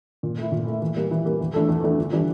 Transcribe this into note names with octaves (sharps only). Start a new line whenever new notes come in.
A#2
A3 E4
A#2
A3 E4
E3
G3 A#3
E3
G3 A#3
E2
E3 A3 D4 A4
E2
E3 A3 D4 A4
G1
E3 G3 D4